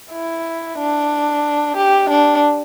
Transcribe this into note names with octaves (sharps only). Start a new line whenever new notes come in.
E4
D4
G4
D4